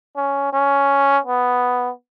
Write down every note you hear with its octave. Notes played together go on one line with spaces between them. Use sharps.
C#4
C#4
B3